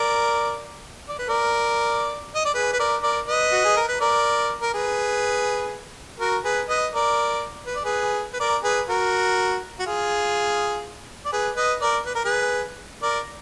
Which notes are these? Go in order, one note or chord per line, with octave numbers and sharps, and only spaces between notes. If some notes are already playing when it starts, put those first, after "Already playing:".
Already playing: A#4 D5
D5
B4
A#4 D5
D#5
D5
G#4 B4
B4
A#4 D5
A#4 D5
B4 D#5
F#4
G#4
A#4
B4
A#4 D5
A#4
G#4 B4
F#4 A#4
G#4 B4
B4 D#5
A#4 D5
B4
D5
G#4 B4
B4
A#4 D5
G#4 B4
F#4 A#4
F#4
F4 G#4
D5
G#4 B4
B4 D#5
A#4 D5
B4
A#4
G#4 B4
A#4 D5